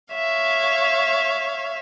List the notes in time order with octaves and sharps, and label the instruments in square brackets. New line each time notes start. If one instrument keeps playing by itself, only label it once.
[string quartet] C#5 E5 F5